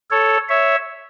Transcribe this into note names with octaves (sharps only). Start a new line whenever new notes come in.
A4 C#5
C#5 E5